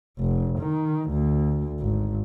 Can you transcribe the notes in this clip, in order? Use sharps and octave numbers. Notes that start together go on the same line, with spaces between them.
F1
D#3
D2
G#1